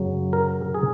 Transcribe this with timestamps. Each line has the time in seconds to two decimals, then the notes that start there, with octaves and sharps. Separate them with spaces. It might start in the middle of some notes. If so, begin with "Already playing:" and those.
Already playing: F#2 C#3 F#3
0.33 A#4
0.74 G#4